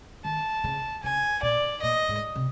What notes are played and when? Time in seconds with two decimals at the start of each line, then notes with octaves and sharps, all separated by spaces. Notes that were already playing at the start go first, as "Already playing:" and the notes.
0.25 D#3 A5
0.64 C#3
1.03 C#3 G#5
1.43 A#2 D5
1.82 A#2 D#5
2.09 G#2
2.36 C3